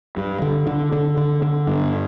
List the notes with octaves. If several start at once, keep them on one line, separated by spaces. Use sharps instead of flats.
G2
D3
D3
D3
D3
D3
G2